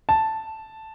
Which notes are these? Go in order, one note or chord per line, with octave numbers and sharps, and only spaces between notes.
A5